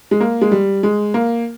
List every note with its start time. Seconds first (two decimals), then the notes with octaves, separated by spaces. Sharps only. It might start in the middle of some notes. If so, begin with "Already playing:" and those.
0.11 G#3
0.20 A#3
0.41 G#3
0.51 G3
0.83 G#3
1.14 A#3